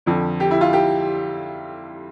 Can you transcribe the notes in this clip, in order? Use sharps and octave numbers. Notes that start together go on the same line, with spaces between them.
F2 D3 F3
G4
E4
F4
G4